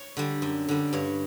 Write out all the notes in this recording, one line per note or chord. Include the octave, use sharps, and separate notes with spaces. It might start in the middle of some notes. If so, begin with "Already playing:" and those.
Already playing: C#5
D3 G3
F#2
D3 G3
G2 C#5